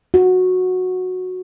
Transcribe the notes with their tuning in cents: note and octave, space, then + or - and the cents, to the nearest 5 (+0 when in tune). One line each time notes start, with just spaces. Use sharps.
F#4 -10